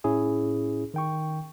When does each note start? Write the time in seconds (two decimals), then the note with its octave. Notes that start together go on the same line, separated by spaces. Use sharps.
0.04 A2 C#4 E4 G#4
0.94 D#3 G5 C#6